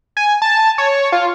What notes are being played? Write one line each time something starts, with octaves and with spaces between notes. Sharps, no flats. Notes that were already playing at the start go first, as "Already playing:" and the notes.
G#5
A5
C#5
F4